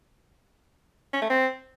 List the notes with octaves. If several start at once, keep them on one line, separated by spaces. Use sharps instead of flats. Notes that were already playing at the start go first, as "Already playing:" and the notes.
C#4
A3
C4